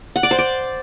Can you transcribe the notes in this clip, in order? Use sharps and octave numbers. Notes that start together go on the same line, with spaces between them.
F#5
D5
C5
D5